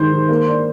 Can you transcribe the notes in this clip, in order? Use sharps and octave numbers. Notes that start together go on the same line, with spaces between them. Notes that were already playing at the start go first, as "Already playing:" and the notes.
Already playing: D#3 G#3 C5
D#3
A#3
D4